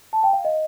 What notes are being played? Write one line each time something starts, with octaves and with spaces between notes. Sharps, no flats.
A5
G5
F5
D#5